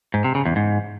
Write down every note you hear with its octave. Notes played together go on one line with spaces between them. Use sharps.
G#2
C3
C#3
E2
G#2